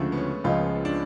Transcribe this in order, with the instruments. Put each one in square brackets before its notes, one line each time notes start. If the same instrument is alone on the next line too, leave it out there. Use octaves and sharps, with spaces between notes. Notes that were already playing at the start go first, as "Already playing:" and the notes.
Already playing: [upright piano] D2 C#3 F3 [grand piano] G#3 A3
[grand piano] B3
C#4
[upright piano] C#2 C#3 F3 G#3 [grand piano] F4
[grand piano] D4